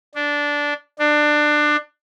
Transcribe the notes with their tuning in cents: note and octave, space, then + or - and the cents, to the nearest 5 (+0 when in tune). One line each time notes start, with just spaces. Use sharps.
D4 -10
D4 +20